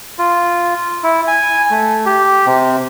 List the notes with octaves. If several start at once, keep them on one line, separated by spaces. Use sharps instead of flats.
F4
E4
G#5
A3
G4
C3